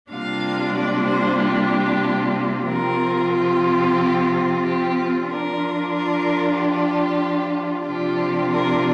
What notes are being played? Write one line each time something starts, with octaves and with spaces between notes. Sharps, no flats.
C3 G3 A#3 D4 F4 F5
D5
C5
G4
C3 F3 C4 F4 A#4
G4
G4
F4
F3 D4 F4 A#4
A#4
G4
C3 F3 D4 F4 G4
A#4